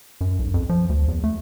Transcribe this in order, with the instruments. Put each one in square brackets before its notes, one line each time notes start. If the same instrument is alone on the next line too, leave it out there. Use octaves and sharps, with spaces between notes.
[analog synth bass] F#2
B1
F2
F3
D2
E2
A3